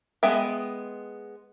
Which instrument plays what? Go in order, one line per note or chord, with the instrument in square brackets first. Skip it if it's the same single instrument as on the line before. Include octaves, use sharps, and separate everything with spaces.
[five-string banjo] G#3 B3 E5 G5